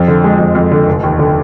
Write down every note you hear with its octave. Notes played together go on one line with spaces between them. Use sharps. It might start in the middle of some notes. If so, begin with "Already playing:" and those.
Already playing: F2 F3
D3
G#3
F2
F2
D3
F1
D#2
D3